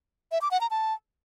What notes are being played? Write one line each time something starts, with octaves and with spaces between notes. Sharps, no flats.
E5
D6
F#5
A#5
A5